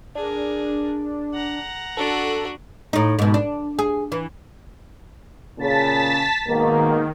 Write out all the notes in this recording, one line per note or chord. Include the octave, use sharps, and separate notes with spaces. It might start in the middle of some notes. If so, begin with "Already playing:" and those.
D4 G#4 A#4
F#5 A#5
D4 F#4 A4
A2 D#4
G#2 B2
D4
G#4
E3
A#2 C#3 A5 A6 B6
G#2 B2 D#3 A#3